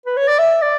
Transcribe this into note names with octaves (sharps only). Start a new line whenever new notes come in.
B4
C#5
D5
E5
D5